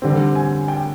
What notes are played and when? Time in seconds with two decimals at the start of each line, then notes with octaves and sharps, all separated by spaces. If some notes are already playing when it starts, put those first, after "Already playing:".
0.02 D3 G3 C4
0.35 G#5
0.68 G5